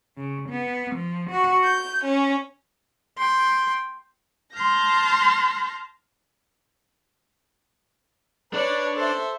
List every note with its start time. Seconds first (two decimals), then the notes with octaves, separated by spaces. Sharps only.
0.16 C#3
0.49 B3
0.95 F3
1.29 F#4
1.63 G6
2.03 C#4
3.18 G5 C6
4.54 A5 C6 F6 G6 A#6
8.54 D4 B4 C#5 D5
8.95 A4 C5 E5